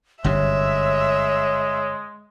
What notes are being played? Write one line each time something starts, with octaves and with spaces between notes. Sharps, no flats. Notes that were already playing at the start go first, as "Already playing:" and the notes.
G1 F#2 C3 G#3 C#5 E5